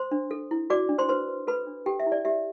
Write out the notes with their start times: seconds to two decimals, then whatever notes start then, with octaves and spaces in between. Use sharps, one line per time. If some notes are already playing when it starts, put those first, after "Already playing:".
Already playing: C5 C6
0.11 D4
0.31 A4
0.51 E4
0.70 F#4 D5 D6
0.89 D4
0.98 C5 C6
1.09 B4 C5 C6
1.28 B4
1.47 A4 B4 B5
1.67 D4
1.86 G4 A4 G5
2.00 E5
2.06 E4
2.12 D5
2.25 G4 E5